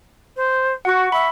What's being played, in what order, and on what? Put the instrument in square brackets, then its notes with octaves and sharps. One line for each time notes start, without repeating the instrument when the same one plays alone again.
[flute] C5
[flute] F#4 [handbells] F#5 C#6
[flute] E5 [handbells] B5